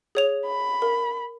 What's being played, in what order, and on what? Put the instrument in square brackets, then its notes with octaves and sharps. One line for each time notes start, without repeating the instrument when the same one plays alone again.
[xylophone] G#4 C#5 F7
[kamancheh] B5
[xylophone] A#4